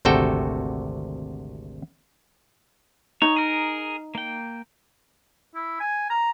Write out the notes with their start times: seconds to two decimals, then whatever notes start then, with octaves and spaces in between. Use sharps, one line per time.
0.05 G#1 D2 C3 F#4 A4 G5
3.22 D#4 C#5
3.36 G#4 A#4
4.15 A#3 G5
5.55 E4
5.80 G#5
6.10 A#5